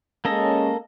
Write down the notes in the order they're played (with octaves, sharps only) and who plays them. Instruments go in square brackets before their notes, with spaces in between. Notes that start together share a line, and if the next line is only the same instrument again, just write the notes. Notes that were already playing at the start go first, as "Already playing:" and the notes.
[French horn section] G#3 C#4 [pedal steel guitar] A#3 A4 D#5